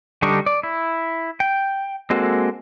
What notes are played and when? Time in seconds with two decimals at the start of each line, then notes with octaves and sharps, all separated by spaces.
0.22 D3 G3 D4 D#4 C#6
0.46 D5
0.63 E4
1.40 G5
2.10 G#3 A#3 C4 F#4 A4